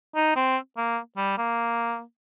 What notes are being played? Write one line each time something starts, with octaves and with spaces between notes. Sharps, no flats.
D#4
C4
A#3
G3
A#3